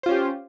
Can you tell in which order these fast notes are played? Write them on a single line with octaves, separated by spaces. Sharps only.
C5 F4 C#4 G4